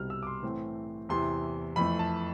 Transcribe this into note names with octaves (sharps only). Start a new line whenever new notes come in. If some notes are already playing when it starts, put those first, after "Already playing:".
Already playing: C2 B2 G3 C4 F6
E6
D6
C6
A2 E3 A3 C4
E2 C3 E3 C6
F2 E3 A3 B5
A5